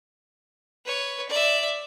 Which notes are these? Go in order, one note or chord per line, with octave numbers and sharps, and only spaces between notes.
B4 C#5
D5 E5